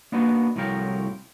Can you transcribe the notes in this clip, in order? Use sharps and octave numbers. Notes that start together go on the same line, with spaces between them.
A#3 B3 D4 D#4 F#4 B4
C2 A2 F3 F#3 A#4 G5